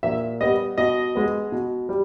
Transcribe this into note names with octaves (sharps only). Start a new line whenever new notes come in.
A#2 E5
G3 B3 D#5
B2 D#5
G#3 B3
B2
G3